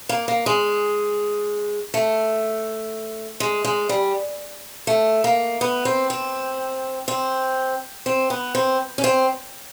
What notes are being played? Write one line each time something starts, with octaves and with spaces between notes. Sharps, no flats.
A#3
A#3
G#3
A3
G#3
G#3
G3
A3
A#3
B3
C4
C4
C4
C4
B3
C4
C#4
C4